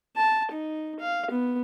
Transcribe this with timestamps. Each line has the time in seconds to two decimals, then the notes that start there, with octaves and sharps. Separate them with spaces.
0.17 A5
0.52 D#4
1.00 F5
1.31 B3